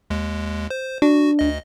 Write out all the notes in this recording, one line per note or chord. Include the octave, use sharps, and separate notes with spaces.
D#2 G#3
C5
D4 F#4
D2 D#5